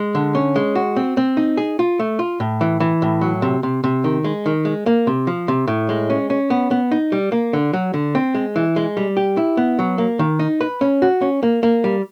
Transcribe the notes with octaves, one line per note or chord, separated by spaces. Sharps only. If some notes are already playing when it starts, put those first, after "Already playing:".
Already playing: G#3
D3
C#4
G#3
F#4
C4
C4
D#4
G#4
F4
A3
F4
A2
E3
E3
A2
F#3
C3
C3
C3
D#3
G#3
D#3
G#3
A#3
C3
F3
C3
A2
G#3
C#4
C#4
B3
B3
D#4
G3
A#3
D3
F#3
D3
C4
G#3
E3
G#3
G3
G4
E4
B3
F#3
A#3
D#3
D#4
B4
C#4
F#4
C#4
A#3
A#3
G3